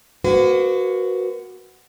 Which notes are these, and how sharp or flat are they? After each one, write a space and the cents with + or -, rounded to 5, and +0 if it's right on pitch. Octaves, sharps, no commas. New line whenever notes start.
A#3 +30 F#4 +0 B4 +45